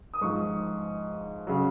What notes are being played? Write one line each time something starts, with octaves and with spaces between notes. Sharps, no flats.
D#6
G#2 F3 C#6
C#3 F#3